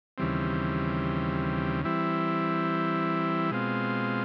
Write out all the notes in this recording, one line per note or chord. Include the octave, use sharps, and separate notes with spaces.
D#2 C#3 E3 G3 C4
E3 G3 C4 E4
B2 G#3 C4 F4